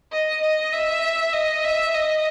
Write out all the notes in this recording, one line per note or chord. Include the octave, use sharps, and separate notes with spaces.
D#5
D#5
E5
D#5
E5
D#5